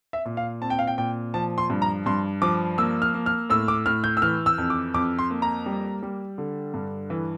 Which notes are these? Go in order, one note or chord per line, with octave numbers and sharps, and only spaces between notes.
E5
A#2
F5
C4 A5
G5
F5
G5
A#2 G5
F3 A5
C6
G2
A#5
G2 C6
F3 D6
A#3 E6
F6
A#3
F6
A2 E6
D6
A2 F6
G6
E6
E3 F6
E6
F2
D6
F2 D6
C6
A#3
A#5
G3
G3
D3
G2
E3